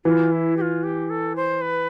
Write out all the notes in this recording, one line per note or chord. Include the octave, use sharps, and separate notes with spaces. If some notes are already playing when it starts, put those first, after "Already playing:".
E3 F4
E4
G4
F4
G4
A4
C5
B4